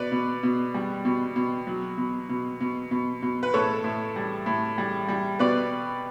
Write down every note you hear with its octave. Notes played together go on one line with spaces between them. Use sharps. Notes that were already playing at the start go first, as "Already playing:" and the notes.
Already playing: B2 B4 D5
B2
B2
G3
B2
B2
F#3
B2
B2
B2
B2
B2
B4
A2 A4 C#5
A2
G3
A2
G3
G3
B2 B4 D5